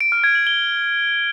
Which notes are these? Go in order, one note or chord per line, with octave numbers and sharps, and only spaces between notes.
D7
F6
G#6
F#7
G7